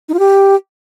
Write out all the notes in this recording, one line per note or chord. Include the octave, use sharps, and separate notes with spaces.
D#4
F4
G4